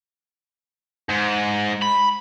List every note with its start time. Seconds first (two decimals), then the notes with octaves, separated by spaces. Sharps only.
1.09 G#2
1.82 B5